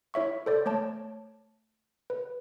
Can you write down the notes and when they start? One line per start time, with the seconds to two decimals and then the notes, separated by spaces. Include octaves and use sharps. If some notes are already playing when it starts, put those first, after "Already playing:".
0.14 E4 C#5 E5 C#6
0.46 A4 C5 D5
0.66 A3 C#5 A5
2.10 B4